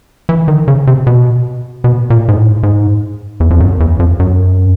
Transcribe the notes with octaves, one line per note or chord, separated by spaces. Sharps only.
E3
D#3
C#3
C3
B2
B2
A#2
G#2
A2
G#2
E2
F2
F#2
E2
F2
F#2